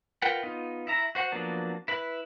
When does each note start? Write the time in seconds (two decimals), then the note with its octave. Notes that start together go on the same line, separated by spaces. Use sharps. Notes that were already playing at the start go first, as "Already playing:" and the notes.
0.22 F4 A#4 B4 F#5 G5
0.43 B3 D#4 F4
0.87 E4 E5 A#5
1.15 F#4 C5 F#5
1.32 F3 F#3 A#3 B3 D4
1.88 E4 B4 B5